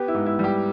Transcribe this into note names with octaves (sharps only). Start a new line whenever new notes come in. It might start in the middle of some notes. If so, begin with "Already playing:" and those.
Already playing: B3 G4
E4
G#2
E4
G3 G4